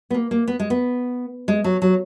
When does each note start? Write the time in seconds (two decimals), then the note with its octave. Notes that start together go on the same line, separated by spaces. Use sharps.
0.10 B3
0.14 A#3
0.31 A#3
0.48 B3
0.60 G#3
0.70 B3
1.48 G#3
1.64 F#3
1.82 F#3